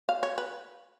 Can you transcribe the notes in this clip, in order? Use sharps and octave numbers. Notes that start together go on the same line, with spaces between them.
F5
C#5
B4